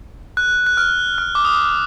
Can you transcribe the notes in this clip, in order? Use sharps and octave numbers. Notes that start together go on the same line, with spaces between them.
F#6
F#6
F6
F6
D6
D#6